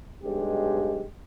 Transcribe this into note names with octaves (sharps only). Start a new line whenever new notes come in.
B1 G2 G#3 G4